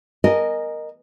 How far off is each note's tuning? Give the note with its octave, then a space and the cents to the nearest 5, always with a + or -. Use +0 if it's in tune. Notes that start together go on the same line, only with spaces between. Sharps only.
A#4 +0 D#5 -15 G#5 +0